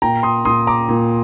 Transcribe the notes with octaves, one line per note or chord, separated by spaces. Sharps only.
A#2 G5 A#5
C6 D#6
A#2 C6 D#6
A#5 D6
A#2